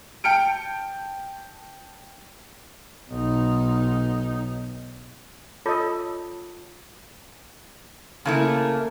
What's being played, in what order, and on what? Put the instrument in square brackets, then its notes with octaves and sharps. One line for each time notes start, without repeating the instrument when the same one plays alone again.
[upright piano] G5 A5 F6 C#7 D7
[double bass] B1 D#4
[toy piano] F4 C#5 D6 [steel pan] A4 D#5
[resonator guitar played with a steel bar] C#3 A3 E4 [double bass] A#3